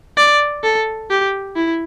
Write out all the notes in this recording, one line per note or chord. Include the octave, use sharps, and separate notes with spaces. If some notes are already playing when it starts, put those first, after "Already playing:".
D5
A4
G4
E4